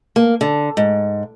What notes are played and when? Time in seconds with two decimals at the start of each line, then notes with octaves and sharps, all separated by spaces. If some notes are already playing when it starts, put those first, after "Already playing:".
0.16 A#3
0.41 D3
0.77 G#2